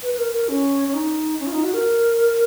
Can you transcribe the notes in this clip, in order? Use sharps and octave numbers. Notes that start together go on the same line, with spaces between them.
B4
B4
A#4
A#4
C#4
C#4
D#4
C#4
F4
D#4
F#4
A#4